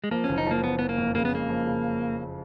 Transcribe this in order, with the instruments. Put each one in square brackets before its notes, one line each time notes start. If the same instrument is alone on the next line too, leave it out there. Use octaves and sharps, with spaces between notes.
[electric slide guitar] G#3
[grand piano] F3 [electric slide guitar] A#3
[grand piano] F#1 [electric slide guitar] C#4
[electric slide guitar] D#4
[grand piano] F3 [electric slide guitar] A#3
[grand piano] F3 [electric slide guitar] B3
[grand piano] F3 [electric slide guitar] B3
[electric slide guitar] A#3
[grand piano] F2
[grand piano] C#3 [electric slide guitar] A#3
[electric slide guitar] B3
[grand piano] G#3 [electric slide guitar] A#3
[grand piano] F3
C#3